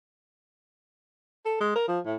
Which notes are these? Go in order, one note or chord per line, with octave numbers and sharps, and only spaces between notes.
A4
G#3
A#4
F3
A2